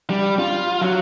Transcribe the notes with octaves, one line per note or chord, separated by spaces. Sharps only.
G3
F4
F#3